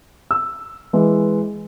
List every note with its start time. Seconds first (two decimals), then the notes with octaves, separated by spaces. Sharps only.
0.31 E6
0.93 E3 G#3